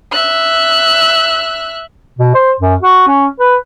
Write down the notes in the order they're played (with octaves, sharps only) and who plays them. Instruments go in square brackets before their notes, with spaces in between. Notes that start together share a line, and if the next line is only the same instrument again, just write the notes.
[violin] E5 F#6
[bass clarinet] B2
C5
F#2
F#4
C#4
B4